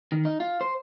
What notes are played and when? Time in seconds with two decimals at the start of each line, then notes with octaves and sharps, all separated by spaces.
0.12 D#3
0.25 D#4
0.40 F4
0.61 C5